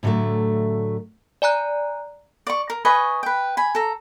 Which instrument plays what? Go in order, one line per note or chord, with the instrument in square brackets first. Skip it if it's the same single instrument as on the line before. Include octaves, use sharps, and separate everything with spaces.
[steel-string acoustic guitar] A2 D3 F#3 G3 A3
[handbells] D5 G#5 A#5 F#6
[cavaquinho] D5 C#6
A#4
B4 D#5 G#5 C#6
B4 G5
G#5 B5
A4 A#5